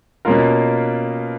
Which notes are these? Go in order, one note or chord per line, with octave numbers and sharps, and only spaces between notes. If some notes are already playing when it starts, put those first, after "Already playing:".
B2 A#3 C#4 F4 A#4